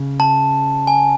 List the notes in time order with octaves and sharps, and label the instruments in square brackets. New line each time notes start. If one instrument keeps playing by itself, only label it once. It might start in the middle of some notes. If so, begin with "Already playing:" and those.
Already playing: [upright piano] C#3
[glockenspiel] A5
G#5